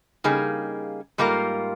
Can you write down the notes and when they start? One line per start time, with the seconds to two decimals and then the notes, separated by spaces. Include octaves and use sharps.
0.24 C#3 G3 A#3 D#4 G#4
1.18 G#2 G3 A#3 F4 A#4